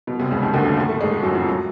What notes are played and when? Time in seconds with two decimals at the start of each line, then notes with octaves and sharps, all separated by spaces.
0.07 B2
0.20 C2 C3
0.31 C#2 C#3
0.42 D#2 D#3
0.53 D2 D3
0.66 D#2 D#3
0.76 A2 A3
0.89 A2 A3
1.01 G#2 G#3
1.11 A2 A3
1.23 F#2 F#3
1.35 F2 F3
1.47 F#3